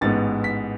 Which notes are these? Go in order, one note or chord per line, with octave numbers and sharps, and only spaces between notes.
A1 G#2 G#3 B3 A6
B6